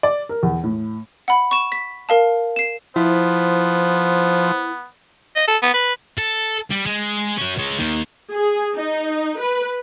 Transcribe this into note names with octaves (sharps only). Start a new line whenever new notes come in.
D5
A#4
E2
A2
F#5 B5
C#6 E7
B6
A#4 F5 A5
C7 E7
F3 B3 E4 C5
D#5
A4
B3
B4
A4
G3
G#3
C#4 F#4
G#3 C#5
D#2 D#3
G#4
D#4
B4